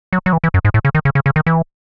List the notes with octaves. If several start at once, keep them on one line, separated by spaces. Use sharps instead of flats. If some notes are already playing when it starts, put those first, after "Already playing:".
F#3
F#3
E3
E3
F#2
G#2
A2
C#3
D#3
C#3
C#3
C#3
D#3
E3